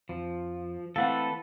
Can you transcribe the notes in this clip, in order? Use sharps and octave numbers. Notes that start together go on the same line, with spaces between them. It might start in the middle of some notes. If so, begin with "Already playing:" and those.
F2 F3
E3 A3 C4 A4 B4 F5 F#5